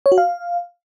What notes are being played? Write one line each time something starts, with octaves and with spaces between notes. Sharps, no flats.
C#5
F#4
F5